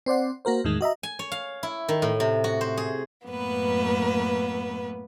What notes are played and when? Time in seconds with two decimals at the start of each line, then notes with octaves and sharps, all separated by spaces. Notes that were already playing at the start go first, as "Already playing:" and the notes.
0.06 C4 C5 D5 F#5
0.45 A#3 F#4 A#4 C5
0.64 E2 A2 D#3 G#3
0.81 F#4 D#5 E5 A#5
1.03 G#5
1.19 C#5
1.32 F5
1.63 E4
1.88 D#3
2.02 A2
2.20 C3
2.44 F#4
2.61 C5
2.77 G#4
3.27 F#2 A2 A#3 B3 B4